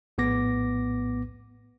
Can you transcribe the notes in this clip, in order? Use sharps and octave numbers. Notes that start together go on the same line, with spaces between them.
A#1 A2 B3 D6 A#6